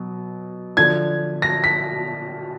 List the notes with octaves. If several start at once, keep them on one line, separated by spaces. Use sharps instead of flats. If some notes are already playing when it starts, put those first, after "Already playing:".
Already playing: B2 F#3
D3 F3 G#6
A#6
B6